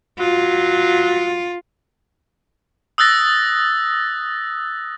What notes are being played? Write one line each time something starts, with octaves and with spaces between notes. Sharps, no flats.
F#3 F4
D#6 E6 F#6 A6 A#6